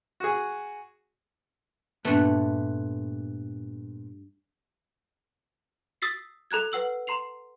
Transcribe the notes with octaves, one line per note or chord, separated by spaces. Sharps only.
F#4 G#4
G2 A#2 A3 B3
D#6 E6 A6 B6 C7
A4 A#5 F#6 G#6
B4 F#5 E6 F#7
A#5 C6 C7 F7